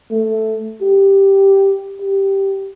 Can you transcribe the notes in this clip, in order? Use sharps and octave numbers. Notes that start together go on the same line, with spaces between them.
A3
G4
G4